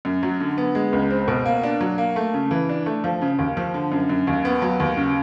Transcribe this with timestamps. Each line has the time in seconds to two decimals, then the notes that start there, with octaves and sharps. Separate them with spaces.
0.05 F#2
0.23 F#3
0.41 D3
0.58 B3
0.75 G#3
0.93 C#2
1.11 C4
1.28 B2
1.45 A#3
1.63 D4
1.81 F#3
1.98 A#3
2.16 A3
2.34 C#3
2.51 E3
2.69 D4
2.86 A3
3.04 F3
3.21 C#3
3.39 D#2
3.57 F3
3.74 D3
3.92 F#2
4.09 F#2
4.27 D#2
4.45 B3
4.62 F#3
4.80 D#2
4.97 C#3